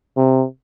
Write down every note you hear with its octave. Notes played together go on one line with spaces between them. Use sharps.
C3